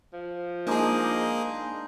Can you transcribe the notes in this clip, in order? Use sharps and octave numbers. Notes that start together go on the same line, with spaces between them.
F3
G#3 A#3 D4 D#4 G#4 D#5